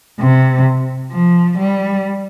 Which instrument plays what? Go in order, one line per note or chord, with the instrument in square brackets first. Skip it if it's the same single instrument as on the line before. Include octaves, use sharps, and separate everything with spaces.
[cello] C3
F3
G3